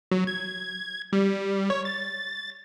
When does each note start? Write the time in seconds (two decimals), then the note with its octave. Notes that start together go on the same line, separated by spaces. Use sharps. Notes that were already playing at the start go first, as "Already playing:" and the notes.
0.11 F#3
0.27 G#6
1.13 G3
1.70 C#5
1.85 A6